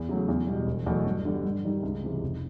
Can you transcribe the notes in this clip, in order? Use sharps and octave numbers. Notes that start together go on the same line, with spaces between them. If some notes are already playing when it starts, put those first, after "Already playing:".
Already playing: E2
C#3 F#3 A3
E2
B2 G3
E1
E2 B2 F#3 A3
G2
D3 G3
G2
D#3 G3
C#2
C3 E3 G#3
F1